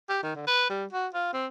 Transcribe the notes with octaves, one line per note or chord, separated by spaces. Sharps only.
G4
D#3
D3
B4
G3
F#4
F4
C4